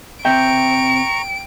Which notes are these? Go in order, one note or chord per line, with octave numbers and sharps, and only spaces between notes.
C3 C4 E5 G5 A#5 C#6 D7